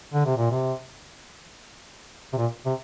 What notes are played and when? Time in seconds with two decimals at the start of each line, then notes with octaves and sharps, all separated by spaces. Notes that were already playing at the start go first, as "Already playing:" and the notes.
0.13 D3
0.26 C3
0.38 A#2
0.50 C3
2.33 C3
2.37 A#2
2.66 C3